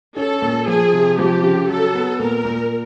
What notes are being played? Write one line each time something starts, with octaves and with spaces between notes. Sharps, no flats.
C#4 A4
A#2
F3 G#4
C3
F3 G4
C#3
F#3 A4
B3
A#2 A#4
A#2